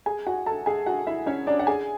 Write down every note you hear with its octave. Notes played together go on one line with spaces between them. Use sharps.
G#4 G#5
F#4 F#5
A4 A5
G#4 G#5
F#4 F#5
E4 E5
C#4 C#5
D4 D5
F#5
G#4 G#5